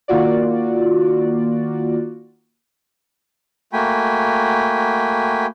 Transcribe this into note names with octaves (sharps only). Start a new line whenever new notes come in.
D#3 A#3 F4 F#4 D5
A3 A#3 F#4 G5 G#5 B5